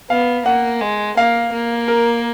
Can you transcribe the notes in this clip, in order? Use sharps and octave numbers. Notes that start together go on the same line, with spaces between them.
B3 F5
A#3 F#5
G#3
A#3 F5
A#3
A#4